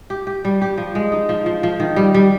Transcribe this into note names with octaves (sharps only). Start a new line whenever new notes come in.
G4
G4
G3
G4
F3
G#3
D#4
F3
F3
F3
D#3
G3
G3